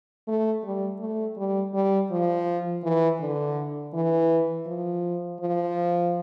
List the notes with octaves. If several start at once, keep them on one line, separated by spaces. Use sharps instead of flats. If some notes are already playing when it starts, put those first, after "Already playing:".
A3
G3
A3
G3
G3
F3
E3
D3
E3
F3
F3